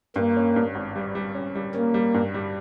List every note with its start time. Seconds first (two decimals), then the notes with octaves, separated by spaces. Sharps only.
0.16 G2 A#3
0.37 C#4
0.56 G2
0.75 G#1
0.95 G3
1.15 G3
1.35 C#4
1.55 G3
1.74 A#3 C#4
1.94 G3
2.14 G2
2.34 G3